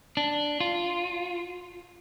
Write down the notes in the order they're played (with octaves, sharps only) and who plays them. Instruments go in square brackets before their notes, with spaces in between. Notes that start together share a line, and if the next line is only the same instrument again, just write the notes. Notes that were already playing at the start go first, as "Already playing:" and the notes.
[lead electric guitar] D4
F4